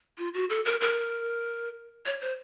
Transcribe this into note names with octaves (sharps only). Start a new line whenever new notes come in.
F4
F#4
A4
A#4
A#4
C#5
C5